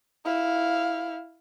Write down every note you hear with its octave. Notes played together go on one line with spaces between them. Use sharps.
E4 F5